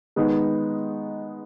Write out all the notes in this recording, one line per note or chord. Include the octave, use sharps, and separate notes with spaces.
D#3 G#3 B3 D#4